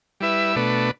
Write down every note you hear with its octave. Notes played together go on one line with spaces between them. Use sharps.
G3 E4 B4 E5
B2 A3 D4 B4